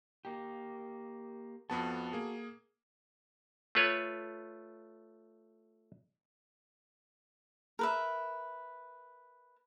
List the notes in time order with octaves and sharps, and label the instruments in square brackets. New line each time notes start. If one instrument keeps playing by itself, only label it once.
[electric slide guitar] A#3 G4
[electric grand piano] F2 B3 A5 [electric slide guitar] F#4 A4
[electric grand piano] A#3 G#4
[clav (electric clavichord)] A3 F4 B4 C#5
[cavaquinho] A#4 B4 E5